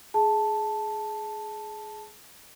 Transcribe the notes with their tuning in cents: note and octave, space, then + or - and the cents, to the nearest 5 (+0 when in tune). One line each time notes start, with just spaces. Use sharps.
G#4 +15 A5 +0